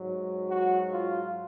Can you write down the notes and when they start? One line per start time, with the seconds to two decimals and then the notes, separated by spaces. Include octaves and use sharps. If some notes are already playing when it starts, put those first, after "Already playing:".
Already playing: G#2 F#3
0.49 F#4
0.90 F4